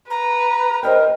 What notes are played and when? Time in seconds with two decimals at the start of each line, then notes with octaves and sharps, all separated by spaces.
0.10 B4 A#5
0.83 A#4 C5 D#5 G5